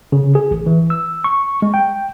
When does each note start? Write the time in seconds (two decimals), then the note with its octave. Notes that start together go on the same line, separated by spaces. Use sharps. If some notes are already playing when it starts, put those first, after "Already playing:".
0.12 C#3
0.35 G#4
0.51 A1
0.66 E3
0.90 E6
1.24 C#6
1.62 G#3
1.74 G5